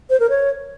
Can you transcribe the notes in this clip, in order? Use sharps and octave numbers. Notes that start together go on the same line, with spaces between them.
C5
A#4
C#5